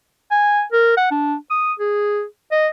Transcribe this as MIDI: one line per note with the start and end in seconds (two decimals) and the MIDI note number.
0.31 0.62 80
0.72 0.94 70
0.97 1.08 78
1.11 1.35 62
1.50 1.73 87
1.79 2.24 68
2.51 2.68 75